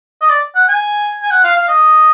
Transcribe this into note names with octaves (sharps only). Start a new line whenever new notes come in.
D#5
D5
F#5
G#5
G#5
F#5
F5
F5
D#5